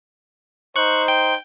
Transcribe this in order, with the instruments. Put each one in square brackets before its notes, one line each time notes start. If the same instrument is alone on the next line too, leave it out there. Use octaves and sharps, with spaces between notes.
[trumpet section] D#4 C5 [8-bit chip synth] C#6 F#6
[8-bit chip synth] G5